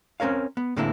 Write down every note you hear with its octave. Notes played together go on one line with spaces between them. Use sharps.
C4 C#4 A#4 C#5 F5
B3
A2 D3 G#3 A#3 C4 E4